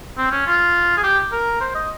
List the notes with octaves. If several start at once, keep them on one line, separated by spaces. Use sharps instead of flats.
C4
C#4
F4
G#4
G4
A#4
C5
D#5